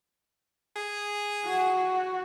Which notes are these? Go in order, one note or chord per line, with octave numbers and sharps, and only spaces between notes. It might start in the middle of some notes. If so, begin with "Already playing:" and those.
G#4
F#4